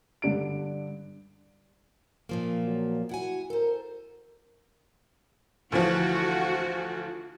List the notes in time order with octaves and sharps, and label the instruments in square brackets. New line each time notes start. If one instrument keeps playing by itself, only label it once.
[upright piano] G2 D3 D4 D7
[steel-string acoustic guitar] A#2 F3 A#3
[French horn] F#3
[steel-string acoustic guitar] E4 F#5 G#5 [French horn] F#4
[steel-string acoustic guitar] A4 C5 [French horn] A#4
[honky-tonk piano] D2 E3 F3 [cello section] F#4